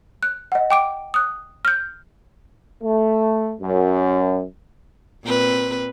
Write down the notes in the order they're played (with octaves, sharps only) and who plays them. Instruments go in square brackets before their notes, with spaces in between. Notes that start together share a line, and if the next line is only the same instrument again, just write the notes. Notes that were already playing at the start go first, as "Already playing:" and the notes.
[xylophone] F#6
D#5 F#5
G5 D6 D7
D#6 F#6
F6 G6
[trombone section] A3
F#2
[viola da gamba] A#2 C4 B4